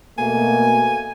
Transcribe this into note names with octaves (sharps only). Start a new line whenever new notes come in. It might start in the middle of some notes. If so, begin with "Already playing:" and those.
B2 A3 A#3 G#5